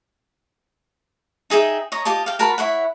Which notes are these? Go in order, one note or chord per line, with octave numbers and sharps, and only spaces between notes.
D#4 G#4 E5 G5
C#5 D#5 A#5
F4 G4 D#5 A5
F5 G5
F#4 A#4 A5 B5
E4 C#5 E5 F#5